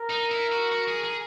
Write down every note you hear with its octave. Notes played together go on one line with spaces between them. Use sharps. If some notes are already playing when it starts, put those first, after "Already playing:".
Already playing: A#4
D#4
E4
F#4
F#4
G#4
G#4